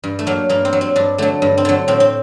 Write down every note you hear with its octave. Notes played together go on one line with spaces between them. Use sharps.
G2
A3
F#3 A#3
G2 A#3
C4
F#3
C4
G2 D4
D3 F#3 A3
G2
C4
D3 F#3
A2 C4
C4